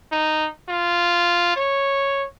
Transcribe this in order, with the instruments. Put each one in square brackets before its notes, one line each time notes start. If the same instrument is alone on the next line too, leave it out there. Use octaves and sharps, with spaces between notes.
[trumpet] D#4
F4
C#5